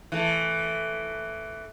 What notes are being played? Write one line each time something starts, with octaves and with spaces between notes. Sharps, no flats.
E3 A3